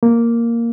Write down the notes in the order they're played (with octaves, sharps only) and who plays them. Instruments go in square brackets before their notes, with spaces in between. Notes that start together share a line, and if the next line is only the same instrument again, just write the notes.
[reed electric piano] A#3